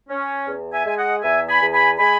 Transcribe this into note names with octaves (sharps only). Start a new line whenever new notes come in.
C#4
E2
E5 G#5
G#3 G#5
D#5 F#5
E2 E5 G#5
G#5 B5
E2
G#5 B5
G#3 G#5 B5